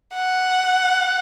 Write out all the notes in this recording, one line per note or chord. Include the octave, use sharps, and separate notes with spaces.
F#5